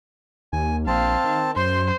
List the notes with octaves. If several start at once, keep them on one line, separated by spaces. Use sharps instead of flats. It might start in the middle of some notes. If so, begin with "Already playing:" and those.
D#2 G#5
A#1 C4 F5 A5
D#3
F#2 C5 C6